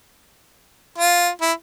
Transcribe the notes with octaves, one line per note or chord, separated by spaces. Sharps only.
F4
E4